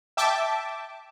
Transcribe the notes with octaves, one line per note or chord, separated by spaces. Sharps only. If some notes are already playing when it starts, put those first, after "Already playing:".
E5 G5 A5 D6